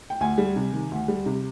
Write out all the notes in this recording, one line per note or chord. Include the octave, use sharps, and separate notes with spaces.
G5
D2 G#5
G3
C3
D#3
D2
G3
C3